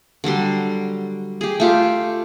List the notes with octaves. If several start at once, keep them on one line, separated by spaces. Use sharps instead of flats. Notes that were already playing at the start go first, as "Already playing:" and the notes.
D3 F#3 G3 C6
G4 G#4
A3 F4 G4